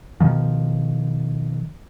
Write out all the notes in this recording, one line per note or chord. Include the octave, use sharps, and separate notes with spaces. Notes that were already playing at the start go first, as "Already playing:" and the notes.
B2 D#3 F3